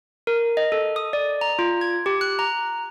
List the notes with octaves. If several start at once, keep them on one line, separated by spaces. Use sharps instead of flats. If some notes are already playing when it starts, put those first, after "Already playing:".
A#4
D#5
A4
D#6
D5
A#5
F4
G#6
G4
F#6
A#5